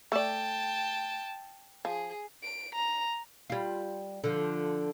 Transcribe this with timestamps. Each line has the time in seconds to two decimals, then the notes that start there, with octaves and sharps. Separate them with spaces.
0.12 A3 D5 G5 A5
1.85 F3 G#4
2.43 D7
2.75 A#5
3.50 G3 F4
4.24 D3 F3